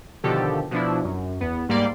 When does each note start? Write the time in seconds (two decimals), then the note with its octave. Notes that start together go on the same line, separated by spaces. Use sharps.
0.23 B2 D3 D#3 F3 G4 A4
0.71 B2 F3 D4 E4
1.04 F#2
1.41 E2 B3
1.69 G#2 G3 A#3 D5 C6